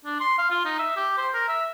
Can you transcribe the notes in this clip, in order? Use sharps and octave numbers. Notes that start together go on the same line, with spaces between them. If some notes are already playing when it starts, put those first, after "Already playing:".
D4
C6
F5
F4
D#4
E5
G4
C5
A#4
E5